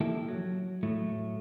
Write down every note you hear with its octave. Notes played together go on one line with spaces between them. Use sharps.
F3 A#3 E4 G4 A4
F#3
A2 F#3 A3